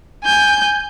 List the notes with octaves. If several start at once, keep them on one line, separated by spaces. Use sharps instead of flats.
G#5 G6